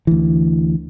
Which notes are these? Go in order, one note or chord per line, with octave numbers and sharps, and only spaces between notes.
D2 E3